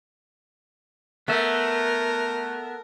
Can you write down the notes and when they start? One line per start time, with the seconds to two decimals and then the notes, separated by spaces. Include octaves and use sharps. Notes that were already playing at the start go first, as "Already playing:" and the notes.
1.28 A3 B3 A#4 E5